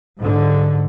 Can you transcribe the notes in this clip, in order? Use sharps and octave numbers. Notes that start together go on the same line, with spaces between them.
G#2 D3